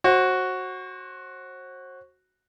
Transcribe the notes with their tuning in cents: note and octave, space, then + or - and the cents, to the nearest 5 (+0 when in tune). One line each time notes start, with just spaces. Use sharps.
F#4 +0 C5 +35